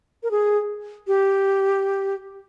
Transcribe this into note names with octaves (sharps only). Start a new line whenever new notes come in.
A#4
G#4
G4